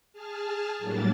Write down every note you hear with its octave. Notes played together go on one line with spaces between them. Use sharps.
G#4 A5 F6
A2 F#3 G3 A#3 D4 A6